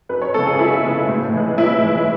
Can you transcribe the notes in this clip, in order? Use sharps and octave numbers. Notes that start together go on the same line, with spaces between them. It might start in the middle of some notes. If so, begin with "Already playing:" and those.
F#2 B4
C#5
C#3 G#3 B3 A4
G#4
F#2 E4
C#3 G#3 B3
A2
E3 G#3
A2 E4
E3 G#3